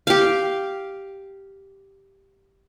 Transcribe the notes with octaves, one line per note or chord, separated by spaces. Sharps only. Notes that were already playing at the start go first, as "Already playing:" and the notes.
G4 F5